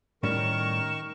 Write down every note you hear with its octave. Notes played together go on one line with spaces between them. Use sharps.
A2 D#3 G3 C#4 A#4 C#6 E7